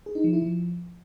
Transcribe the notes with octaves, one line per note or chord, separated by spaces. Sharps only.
G#4
D#4
F3
E4
F3